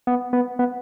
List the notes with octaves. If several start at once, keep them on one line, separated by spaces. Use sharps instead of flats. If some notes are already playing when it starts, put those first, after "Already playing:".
B3
B3
B3